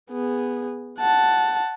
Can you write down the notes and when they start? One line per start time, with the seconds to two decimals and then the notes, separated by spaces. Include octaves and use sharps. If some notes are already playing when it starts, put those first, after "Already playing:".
0.11 B3 G#4
0.99 F#5 A5